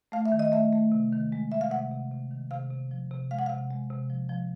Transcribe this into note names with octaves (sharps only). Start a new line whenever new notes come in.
A3 F5
E5
D#3
D#5
A3 E5
A3
C3
D#3
G#3
G#3 E5
F5
C3 F#5
C3
C3
D#3
C3 F5
C3
F3
C3
G#3 F5
F#5
C3 F5
G#3
C3
F3
F3